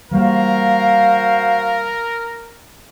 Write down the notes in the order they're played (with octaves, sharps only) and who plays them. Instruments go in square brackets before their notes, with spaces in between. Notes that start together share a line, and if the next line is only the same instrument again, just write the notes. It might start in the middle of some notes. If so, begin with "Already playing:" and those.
[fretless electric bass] E3 G3 A#3 [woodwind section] F#4 C5 F5 [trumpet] A#4